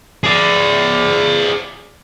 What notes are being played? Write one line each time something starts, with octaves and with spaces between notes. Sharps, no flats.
G#4 D5